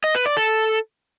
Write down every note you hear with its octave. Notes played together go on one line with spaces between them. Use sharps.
D#5
B4
D5
A4